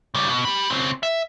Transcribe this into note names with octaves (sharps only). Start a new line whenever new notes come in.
C#3 G3
B2
G4 B5
C#3 C4
E5